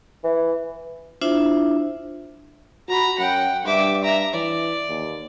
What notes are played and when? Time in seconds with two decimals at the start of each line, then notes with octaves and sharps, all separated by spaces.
0.24 E3
1.21 D4 E4 F4 C5 E5
2.89 F#4 A#5 B5
3.18 F#2 F#5 G5
3.65 G2 E5 D6
4.03 E5 A#5
4.34 E3 D5
4.89 D#2